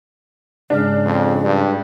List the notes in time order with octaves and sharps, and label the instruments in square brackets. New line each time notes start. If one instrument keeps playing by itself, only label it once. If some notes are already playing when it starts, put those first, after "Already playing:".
[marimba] G#2 G#3 F6 [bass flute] C#3 [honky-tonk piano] D4
[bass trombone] F2
G2